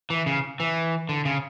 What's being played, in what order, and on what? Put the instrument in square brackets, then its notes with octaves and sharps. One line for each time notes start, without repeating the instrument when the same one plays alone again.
[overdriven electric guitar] E3
C#3
E3
D3
C#3